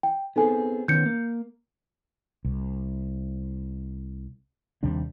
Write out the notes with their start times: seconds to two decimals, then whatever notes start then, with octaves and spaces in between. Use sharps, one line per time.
0.03 G5
0.36 B3 C4 D#4 G#4 A4 G#5
0.88 D#3 B3 C#4 G6 C#7
1.06 A#3
2.45 C2
4.83 D#2 C3 G3 D4